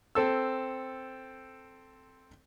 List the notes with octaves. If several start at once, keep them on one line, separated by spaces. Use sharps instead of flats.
C4 A4 E6